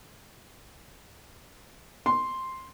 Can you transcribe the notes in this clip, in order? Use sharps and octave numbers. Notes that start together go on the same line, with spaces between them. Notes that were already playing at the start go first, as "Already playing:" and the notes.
C6